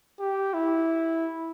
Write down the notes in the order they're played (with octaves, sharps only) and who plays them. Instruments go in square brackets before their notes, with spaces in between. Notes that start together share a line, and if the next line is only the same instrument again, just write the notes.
[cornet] G4
E4